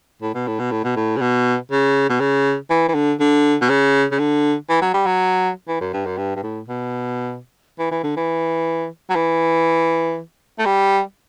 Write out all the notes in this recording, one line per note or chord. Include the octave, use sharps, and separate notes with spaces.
A2
B2
A2
B2
A2
B2
A2
C#3
B2
C#3
B2
C#3
E3
E3
D3
D3
B2
C#3
C#3
D3
E3
F#3
G3
F#3
E3
F#2
G2
F#2
G2
G2
A2
B2
E3
E3
D3
E3
F#3
E3
A3
G3